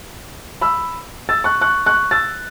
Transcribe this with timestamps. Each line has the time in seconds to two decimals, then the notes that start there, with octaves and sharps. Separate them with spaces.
0.61 B5 E6
1.29 E6 A6
1.44 C#6 F#6
1.61 C#6 F#6
1.86 C#6 F#6
2.11 E6 A6